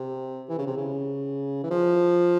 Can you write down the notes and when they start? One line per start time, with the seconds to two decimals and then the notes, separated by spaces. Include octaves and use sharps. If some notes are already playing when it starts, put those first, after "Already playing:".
Already playing: C3
0.49 E3
0.58 C#3
0.67 C3
0.77 C#3
1.64 E3
1.71 F3